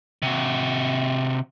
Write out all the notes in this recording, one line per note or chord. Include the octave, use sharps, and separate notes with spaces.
C3 F#4